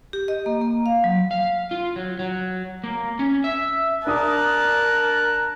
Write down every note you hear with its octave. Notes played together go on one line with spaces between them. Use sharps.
G4
D#5
A#3
A#3
F5
F#3
F5
F4
F#3
F#3
A#3
C#4
E5
D4 A#4 A5 D#6 F#6